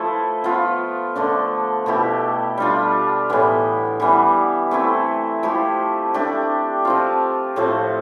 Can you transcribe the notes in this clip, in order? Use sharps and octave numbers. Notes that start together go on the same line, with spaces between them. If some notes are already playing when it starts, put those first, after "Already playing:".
Already playing: F3 A3 E4 A4 B4
F3 B3 F4
D3 A3 D4
B2 A3 E4 G4
G3 D4 F4
A2 E3 B3
E3 G3 B3 E4
A3 C4 E4
F3 A3 E4 G4
A3 D4 G4
F3 C4 F4
A2 F3 A3 C4